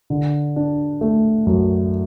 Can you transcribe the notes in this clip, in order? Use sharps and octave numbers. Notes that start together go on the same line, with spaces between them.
D3
D4
A3
F#2